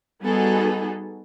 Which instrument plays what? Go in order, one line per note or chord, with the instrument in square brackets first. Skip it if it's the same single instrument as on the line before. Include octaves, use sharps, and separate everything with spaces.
[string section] G3 B3 D#4 F#4 G#4 A4